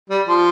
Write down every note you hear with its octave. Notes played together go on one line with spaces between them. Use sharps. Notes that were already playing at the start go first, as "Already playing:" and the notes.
G3
F3